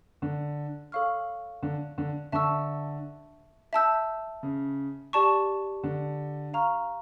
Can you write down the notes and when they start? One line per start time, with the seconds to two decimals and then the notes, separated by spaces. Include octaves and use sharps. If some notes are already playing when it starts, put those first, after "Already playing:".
0.22 D3
0.92 A4 C#5 F5 C#6 F6
1.63 D3
1.98 D3
2.32 D3 E5 A5 C#6 E6
3.73 E5 A5 E6 G6
4.43 C#3
5.13 G4 D5 A5 C#6
5.83 D3
6.54 F5 A#5 C#6 F6